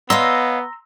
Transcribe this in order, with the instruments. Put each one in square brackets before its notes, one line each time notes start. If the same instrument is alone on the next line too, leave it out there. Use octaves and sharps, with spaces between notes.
[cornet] B3 [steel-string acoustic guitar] C#5 D#5 F5 [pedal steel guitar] A#5 C6 E6